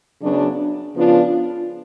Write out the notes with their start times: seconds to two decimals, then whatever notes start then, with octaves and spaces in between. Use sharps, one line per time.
0.22 F#2 C#3 F#3 B3 D4
0.95 C#3 F3 B3 D4 F4